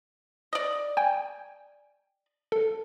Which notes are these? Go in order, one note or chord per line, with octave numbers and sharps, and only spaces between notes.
D5 D#5
G5 G#5
A4